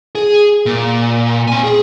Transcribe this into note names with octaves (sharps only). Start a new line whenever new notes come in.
G#4
A#2
C4 G#5
G#4